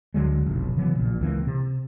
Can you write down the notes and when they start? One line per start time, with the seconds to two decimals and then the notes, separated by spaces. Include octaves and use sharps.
0.14 D2 D3 F#3 G#3
0.46 F1 B1
0.77 C#3 E3 F#3 B3
0.95 A#1 A#2
1.21 C#2 E3 A#3 C4
1.47 C3